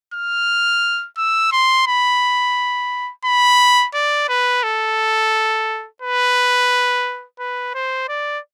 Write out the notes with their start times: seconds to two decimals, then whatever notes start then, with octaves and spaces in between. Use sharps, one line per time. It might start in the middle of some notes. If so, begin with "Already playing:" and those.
0.14 F6
1.17 E6
1.52 C6
1.87 B5
3.25 B5
3.94 D5
4.29 B4
4.63 A4
6.02 B4
7.39 B4
7.74 C5
8.09 D5